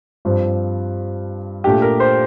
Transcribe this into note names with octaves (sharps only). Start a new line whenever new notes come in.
G2 F3 C4
A#2 A3 D4 G4
A#4
C5